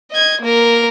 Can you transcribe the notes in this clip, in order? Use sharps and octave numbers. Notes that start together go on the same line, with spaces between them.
D#5 G#6
A#3 A#4